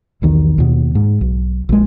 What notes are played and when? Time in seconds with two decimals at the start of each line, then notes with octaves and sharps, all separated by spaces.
0.22 B1 E2 D#3
0.58 D#2 B2
0.95 G#2
1.21 B1
1.69 A#1 G#3